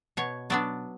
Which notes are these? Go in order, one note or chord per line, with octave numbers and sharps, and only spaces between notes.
B2 C#5
F#3 B3 D4 D5